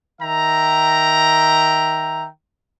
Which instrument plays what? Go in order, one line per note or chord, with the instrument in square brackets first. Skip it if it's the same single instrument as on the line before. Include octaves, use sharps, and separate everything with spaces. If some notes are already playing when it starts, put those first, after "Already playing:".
[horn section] D#3 E5 G5 A#5